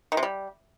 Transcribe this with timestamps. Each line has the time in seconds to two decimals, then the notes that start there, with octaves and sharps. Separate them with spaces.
0.12 D#3
0.17 C3
0.23 G3